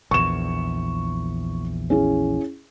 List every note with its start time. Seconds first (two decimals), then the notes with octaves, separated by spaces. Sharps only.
0.11 A#1 E2 C#6 E7
1.90 C#4 E4 G#4